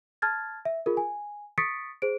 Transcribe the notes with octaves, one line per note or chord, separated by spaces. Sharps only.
A5 F6 G#6 A6
E5
F4 G#4 A#4
G#5
C#6 D#6 A6 B6 C#7 D7
G#4 C5 D7